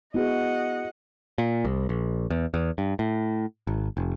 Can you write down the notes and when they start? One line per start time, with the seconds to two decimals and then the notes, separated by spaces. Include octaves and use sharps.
0.14 B3 E4 F#4 G#4 D#5 F#5
1.38 A#2
1.65 C2
1.89 A#1
2.30 E2
2.54 E2
2.78 G2
2.99 A2
3.67 G#1
3.97 F1